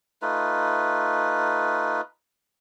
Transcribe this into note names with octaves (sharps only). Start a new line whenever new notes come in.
A3 D#4 F4 B4